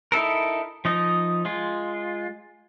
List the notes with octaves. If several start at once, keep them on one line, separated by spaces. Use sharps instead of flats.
D#4 E4 A4 A#4
F3 D#4 D#5
G#3 F4